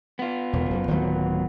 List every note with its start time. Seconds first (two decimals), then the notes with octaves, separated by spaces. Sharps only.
0.19 B3 F4
0.53 E1
0.70 F#1
0.87 D1 D#3 F#3